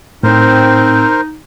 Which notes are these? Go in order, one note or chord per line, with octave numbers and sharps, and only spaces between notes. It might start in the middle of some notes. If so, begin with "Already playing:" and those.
A2 C4 D#4 A#4 C5